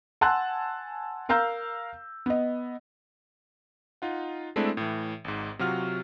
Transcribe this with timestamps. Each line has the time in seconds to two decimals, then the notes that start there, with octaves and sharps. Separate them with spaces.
0.21 F#5 G#5 A5 C6 E6 F#6
1.29 A#4 F5 A#5 E6 G6
2.26 B3 D#5
4.02 D#4 F4 F#5
4.56 G#3 A3 C4 D4 E4 A4
4.77 A2 E3
5.24 G#1 G#2
5.59 C3 F#3 F4 F#4 F6